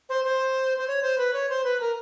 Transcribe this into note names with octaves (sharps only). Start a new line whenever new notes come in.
C5
C5
C5
C#5
C5
B4
C#5
C5
B4
A#4